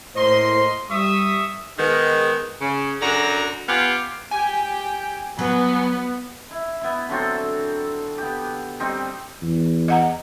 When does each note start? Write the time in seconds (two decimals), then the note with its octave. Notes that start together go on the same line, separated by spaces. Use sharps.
0.15 A2 A#3 C5 D#5 C6
0.90 G3 E5 C#6 D#6
1.78 D#3 G#3 B3
2.61 C#3
3.01 F#2 F#3 D4 F#4 A4 A#5
3.68 B3 F4 G4 F5 F#5 G#5
4.31 G4 G5 G#5
5.39 F#3 B3 B4
6.51 E4
6.81 B3 E4
7.09 D3 F#3 C4 A4
8.18 B3 G4
8.80 G3 C4 D#4
9.42 E2
9.88 D#5 F#5 A#5